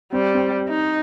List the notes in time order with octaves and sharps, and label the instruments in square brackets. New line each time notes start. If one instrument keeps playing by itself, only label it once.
[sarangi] G3 [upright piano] C4
[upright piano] C4
[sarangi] D#4